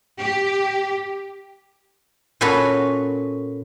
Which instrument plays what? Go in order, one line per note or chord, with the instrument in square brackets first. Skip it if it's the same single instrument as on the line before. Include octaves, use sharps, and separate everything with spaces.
[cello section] G4
[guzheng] A#2 C#4 F#4 A4 B4 A#5